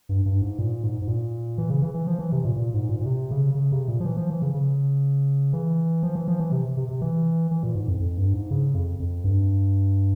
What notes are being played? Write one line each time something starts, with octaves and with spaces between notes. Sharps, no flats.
G2
G2
G#2
A#2
G#2
G#2
A#2
E3
C#3
E3
E3
F3
E3
C3
A#2
A#2
G#2
A#2
A#2
C3
C#3
C#3
C3
A#2
F3
E3
F3
E3
C#3
C#3
E3
F3
E3
F3
E3
C3
C3
C3
E3
E3
A#2
G#2
F2
F2
G2
G#2
C#3
F2
F2
G2